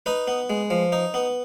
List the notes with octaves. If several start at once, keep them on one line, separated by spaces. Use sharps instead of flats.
D#4 B4
B3
G#3
F3
D#4
B3